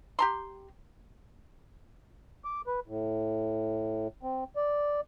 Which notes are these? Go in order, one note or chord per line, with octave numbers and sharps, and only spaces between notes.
G4 A#5 C6
D6
B4
A2
C4
D5